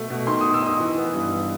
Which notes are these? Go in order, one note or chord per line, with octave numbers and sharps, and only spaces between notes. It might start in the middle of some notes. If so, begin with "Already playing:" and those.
Already playing: B2 A3
B2
D#3 C6
D#3 D#6
E6
D#4 D#6
E3
B3
G2